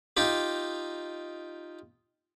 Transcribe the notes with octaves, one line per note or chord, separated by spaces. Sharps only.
D#4 F4 G4